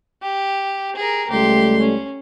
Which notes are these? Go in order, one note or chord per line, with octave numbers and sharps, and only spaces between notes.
G4
G#4 A#4
C#2 G3 A3 G4 C6
C#4